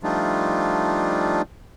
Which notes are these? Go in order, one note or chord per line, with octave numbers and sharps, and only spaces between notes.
F3 G3 A3 D4 D#4 F4